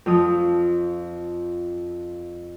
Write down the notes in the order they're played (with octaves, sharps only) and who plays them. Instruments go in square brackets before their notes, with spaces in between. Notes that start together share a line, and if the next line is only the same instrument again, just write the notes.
[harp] F2 F3 D#6